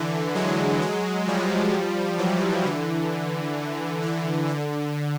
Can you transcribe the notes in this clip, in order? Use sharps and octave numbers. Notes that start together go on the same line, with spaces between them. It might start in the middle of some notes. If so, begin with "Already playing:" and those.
Already playing: D3 E3
F#3 G#3
F#3 G#3
F3 G3
E3 F#3
D3 E3
D3 E3
D3